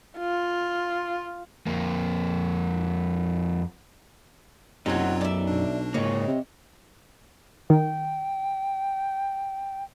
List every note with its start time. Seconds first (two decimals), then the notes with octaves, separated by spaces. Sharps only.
0.18 F4
1.66 F2 A#3
4.86 F#1 F#2 C3 F#3 C4 D#4 F4 C#5
5.21 B1 D5 E5
5.47 B2 D4
5.94 G#2 C#3 A#3 C#5 D#5
6.28 C3
7.70 D#3 G5